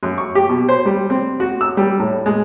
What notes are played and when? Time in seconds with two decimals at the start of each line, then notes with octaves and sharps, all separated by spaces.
0.03 F#2
0.18 C#6
0.35 G4
0.49 B2
0.69 C5
0.86 G3
1.10 C4
1.40 F#4
1.61 E6
1.77 G3
2.00 A2
2.26 G#3